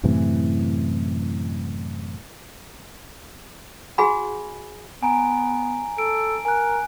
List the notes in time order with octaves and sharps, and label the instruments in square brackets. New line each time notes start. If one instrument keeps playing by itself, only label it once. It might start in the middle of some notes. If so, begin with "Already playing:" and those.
[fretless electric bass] F#2 A2 C3 E3
[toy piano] F#4 G#4 F#5 G#5 B5
[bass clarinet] B3 [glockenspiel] G#5 A#5 D7
[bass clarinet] A4 [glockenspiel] D7
[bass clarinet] A#4 [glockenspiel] G#5 F#6